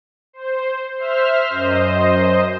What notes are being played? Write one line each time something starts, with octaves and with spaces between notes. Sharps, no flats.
C5
C5 E5 F6
F#2 C5 D#5